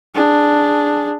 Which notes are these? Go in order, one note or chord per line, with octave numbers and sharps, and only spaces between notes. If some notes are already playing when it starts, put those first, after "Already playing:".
D4 G#4